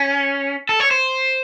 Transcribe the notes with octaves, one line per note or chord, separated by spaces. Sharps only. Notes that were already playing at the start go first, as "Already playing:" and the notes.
Already playing: C#4
A4
C#5
C5